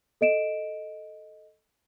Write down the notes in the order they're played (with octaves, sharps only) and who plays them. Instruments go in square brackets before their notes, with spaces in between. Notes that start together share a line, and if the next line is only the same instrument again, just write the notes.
[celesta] A4 D#5 D7 E7